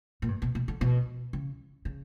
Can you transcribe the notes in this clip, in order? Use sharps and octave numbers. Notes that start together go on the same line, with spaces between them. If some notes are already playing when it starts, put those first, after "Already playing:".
A#2
G2
B2
B2
D3
B2
C#3
C#3